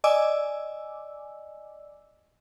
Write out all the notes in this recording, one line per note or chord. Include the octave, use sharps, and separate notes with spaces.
D5 D#5 G#5 D6 E6